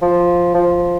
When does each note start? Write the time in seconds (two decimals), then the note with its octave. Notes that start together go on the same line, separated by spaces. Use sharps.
0.02 F3
0.54 F3